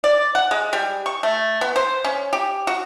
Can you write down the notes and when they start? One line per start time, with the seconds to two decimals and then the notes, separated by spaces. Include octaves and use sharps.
0.04 D5
0.35 F#5
0.51 G#3
0.73 G3
1.06 C#6
1.23 A3
1.61 B3
1.76 C5
2.04 C#4
2.33 G4
2.67 F#4